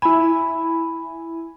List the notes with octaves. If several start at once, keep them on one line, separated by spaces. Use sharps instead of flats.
E4 G#5 B5